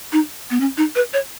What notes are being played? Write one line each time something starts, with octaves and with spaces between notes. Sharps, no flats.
D#4
B3
C#4
D#4
B4
C#5